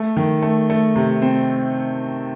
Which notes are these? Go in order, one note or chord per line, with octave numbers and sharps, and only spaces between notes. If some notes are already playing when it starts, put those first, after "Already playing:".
Already playing: A3
D#3
A3
A3
C3
C4